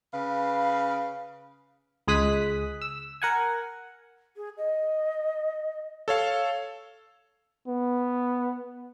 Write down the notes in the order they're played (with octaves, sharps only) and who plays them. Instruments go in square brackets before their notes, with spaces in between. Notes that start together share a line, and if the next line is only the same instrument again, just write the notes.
[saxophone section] C#3 B4 F5
[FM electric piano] C#2 G#3 G#4 D#6 F#6 B6
E6
A#4 F#5 G#5
[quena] G#4
D#5
[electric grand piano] A4 C#5 F5
[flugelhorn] B3